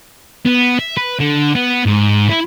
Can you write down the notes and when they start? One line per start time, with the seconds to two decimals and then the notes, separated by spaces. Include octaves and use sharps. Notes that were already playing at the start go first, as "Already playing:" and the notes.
0.46 B3
0.79 E5
0.97 B4
1.20 D3
1.55 B3
1.86 G#2
2.29 E4